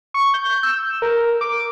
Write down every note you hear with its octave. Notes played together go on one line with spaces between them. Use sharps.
C#6
G6
E6
A#4
D6